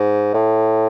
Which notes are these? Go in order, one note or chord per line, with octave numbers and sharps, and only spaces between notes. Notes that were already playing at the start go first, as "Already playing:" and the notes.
Already playing: G#2
A2